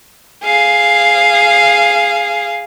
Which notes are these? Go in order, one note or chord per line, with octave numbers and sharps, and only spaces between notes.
G#4 F5